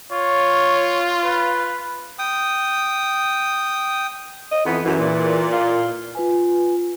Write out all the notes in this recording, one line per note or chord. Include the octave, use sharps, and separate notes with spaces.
F4 C#5
B4
G5 D#6
D#5
F2 E3 B3
F#2 E3
A#2
F4
F4 B4 G#5